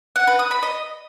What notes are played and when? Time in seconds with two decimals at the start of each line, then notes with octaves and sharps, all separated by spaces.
0.16 F#5
0.27 B4
0.39 D#6
0.51 B5
0.63 D#5